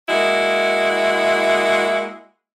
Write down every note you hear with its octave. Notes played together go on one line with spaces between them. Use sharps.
G#3 A#3 E4 F#4 D#5